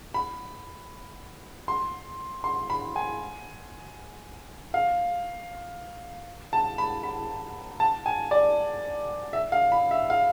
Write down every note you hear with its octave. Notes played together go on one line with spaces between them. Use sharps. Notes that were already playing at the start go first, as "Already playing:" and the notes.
B5
C6
C6
B5
G#5
F5
A5
B5
B5
A5
G#5
D5
E5
F5
B5
E5
F5